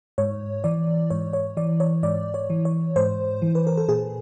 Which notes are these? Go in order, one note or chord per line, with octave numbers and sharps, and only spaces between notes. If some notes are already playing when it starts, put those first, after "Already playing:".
G#2 C#5
E3 D5
G#2 C#5
C#5
E3 D5
C#5
G#2 D5
C#5
E3
C#5
G#2 C5
E3
B4
A#4
A4
A#2 G#4